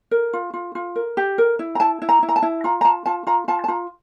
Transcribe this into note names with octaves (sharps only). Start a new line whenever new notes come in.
A#4
F4
F4
F4
A#4
G4
A#4
E4
A#5
E4 A5
E4
A#5
E4
A#5
A5
E4
F4 A#5
A#5
F4 A5
F4 A5
F4 A#5
F4 A5
A5
F4 A#5